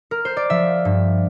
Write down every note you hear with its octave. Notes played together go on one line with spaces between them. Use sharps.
A#4
C5
D5
F3 E5
G2